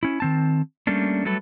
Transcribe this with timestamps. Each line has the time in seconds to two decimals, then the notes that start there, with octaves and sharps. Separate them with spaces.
0.03 C#4 E4
0.20 D#3 C4 A5
0.87 G3 A3 A#3 C#4 D4
1.25 F#3 G3 A3 A4 B4